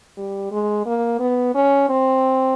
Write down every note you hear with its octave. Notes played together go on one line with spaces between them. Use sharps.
G3
G#3
A#3
B3
C#4
C4